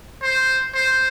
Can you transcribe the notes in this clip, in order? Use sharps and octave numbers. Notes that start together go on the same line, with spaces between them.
C5
C5